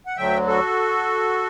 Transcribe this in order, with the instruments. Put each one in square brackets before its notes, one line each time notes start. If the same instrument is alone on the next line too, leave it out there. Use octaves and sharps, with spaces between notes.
[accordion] F#5
D2 D3 F#3 E5 G5
F#4 A4